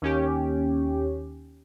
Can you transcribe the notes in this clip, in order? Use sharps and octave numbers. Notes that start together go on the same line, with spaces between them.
D#2 C#4 G4